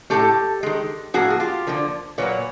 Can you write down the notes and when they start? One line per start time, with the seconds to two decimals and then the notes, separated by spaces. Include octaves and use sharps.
0.10 A2 F3 A3 G4 A4
0.63 D#3 G#3
1.14 A2 F3 A#3 F#4 G#4
1.30 G#4
1.40 F4 G4
1.67 D3 F3 A#3
2.18 A#2 F#3 A#3 B4 C#5